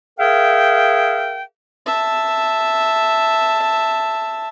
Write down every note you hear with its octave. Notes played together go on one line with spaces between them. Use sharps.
G#4 A#4 E5 F5 G5
E5 A5